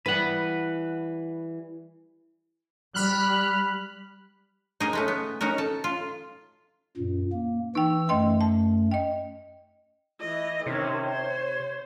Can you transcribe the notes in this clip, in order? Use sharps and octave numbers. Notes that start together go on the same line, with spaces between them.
E3 G3 B4 F#5
G3 B5 F6 F#6
D#4 G#4 A#4
G#3 A3 C#4
B3
C#4 D#4 F#4 A#4
A4 A5
F4
F#2 A#2
A#3
E3 D#4 G5 E6
F#2 A3 D#5 G5 C6
A5
D#5 G5
E3 D#5
C3 D#3 C#4 C#5
C5